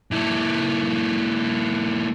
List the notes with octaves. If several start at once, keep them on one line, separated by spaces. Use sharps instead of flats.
A#2 E4